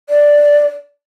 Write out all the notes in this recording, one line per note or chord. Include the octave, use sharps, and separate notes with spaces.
D5